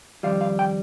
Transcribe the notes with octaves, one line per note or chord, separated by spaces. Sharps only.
F2 D#3 G3 F5
F5
G5